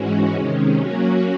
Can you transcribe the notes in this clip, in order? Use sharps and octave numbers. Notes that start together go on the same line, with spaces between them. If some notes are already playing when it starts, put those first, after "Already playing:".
Already playing: G#2 E3 G#3 C#4 F#4
C3 D#3 G#3 C#4
F#3 A#3 C#4 F#4